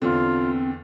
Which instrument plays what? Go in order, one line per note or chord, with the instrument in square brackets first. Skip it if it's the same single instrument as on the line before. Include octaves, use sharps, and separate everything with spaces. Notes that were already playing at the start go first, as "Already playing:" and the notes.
[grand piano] E2 D3 [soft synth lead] C4 [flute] F4